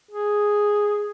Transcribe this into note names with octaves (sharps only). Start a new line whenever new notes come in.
G#4